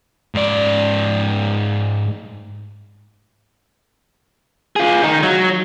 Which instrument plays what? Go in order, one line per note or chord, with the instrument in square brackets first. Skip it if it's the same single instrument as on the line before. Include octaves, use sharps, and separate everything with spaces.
[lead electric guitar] G#2 D5
F4 G#4
D#3 D#4
F#3